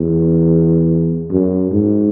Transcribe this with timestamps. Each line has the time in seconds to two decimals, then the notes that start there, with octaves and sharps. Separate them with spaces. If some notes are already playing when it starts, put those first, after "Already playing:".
Already playing: E2
1.30 F#2
1.71 G#2